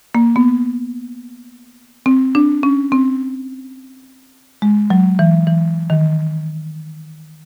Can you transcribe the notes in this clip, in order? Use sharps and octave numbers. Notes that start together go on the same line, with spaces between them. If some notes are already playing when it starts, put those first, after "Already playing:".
A#3
B3
C4
D4
C#4
C4
G#3
F#3
E3
E3
D#3